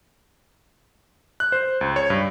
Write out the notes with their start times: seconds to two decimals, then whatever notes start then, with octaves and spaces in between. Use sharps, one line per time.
1.40 F#6
1.52 C5
1.81 C#2
1.96 C#5
2.10 G2